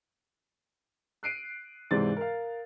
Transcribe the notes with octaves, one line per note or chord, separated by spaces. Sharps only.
F#6 C7 D7 D#7
G#2 C3 E3 C5 D5 A6
A#4 F5